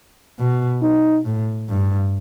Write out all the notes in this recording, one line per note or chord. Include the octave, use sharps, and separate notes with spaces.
B2
D#4
A2
G2